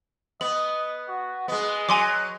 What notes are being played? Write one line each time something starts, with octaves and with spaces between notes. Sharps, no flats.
B3 D#5 F#7
F#4
G#3 B3 D#5
F#3 G#5 C6 D6